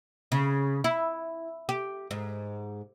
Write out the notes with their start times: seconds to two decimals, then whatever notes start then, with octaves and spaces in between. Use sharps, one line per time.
0.32 C#3
0.84 E4
1.69 G4
2.11 G#2